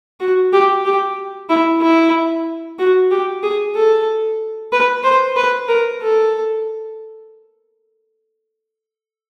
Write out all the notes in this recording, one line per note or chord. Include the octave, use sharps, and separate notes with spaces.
F#4
G4
G4
E4
E4
F#4
G4
G#4
A4
B4
C5
B4
A#4
A4